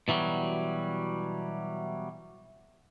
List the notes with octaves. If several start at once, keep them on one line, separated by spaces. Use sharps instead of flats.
B2 E3 F#3 G3